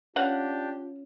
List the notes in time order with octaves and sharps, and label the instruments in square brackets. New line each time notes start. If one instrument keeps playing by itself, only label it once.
[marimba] C#4 C#5 [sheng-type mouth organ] D4 G4 [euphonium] F4 [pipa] F5 F#5